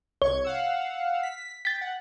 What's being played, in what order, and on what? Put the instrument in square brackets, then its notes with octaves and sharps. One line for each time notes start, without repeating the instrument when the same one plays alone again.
[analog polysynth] C2 C#6 G#6 [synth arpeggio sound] C#5
[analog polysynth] F5 F#5 E6
B6
[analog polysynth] G5 [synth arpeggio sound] A6 B6
[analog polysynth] F#5